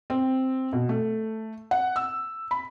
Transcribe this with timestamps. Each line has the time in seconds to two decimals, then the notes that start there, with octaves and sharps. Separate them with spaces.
0.10 C4
0.73 B2
0.89 A3
1.71 F#5
1.96 E6
2.51 B5